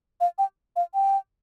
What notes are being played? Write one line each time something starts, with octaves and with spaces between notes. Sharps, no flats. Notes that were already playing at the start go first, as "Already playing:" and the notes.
F5
G5
F5
G5